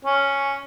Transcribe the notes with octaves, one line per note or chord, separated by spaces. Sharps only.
C#4